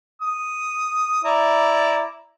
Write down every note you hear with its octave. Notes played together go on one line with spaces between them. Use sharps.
D#6
E4 D5 A#5